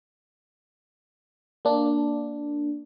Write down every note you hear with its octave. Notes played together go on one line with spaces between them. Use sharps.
A#3 D4